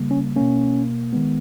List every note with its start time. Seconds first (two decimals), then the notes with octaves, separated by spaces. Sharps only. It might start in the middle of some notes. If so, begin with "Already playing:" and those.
Already playing: C#3 G3 A#3
0.11 C#4
0.36 B2 A#3 C#4
1.13 D#3 G#3 B3